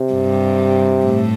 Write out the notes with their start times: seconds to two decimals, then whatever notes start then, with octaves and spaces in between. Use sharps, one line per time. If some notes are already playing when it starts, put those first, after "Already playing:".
Already playing: C3
0.13 G2 G3
1.05 A2 A3